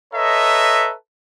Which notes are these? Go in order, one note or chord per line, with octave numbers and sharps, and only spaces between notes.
A4 B4 C#5 D#5 E5 A#5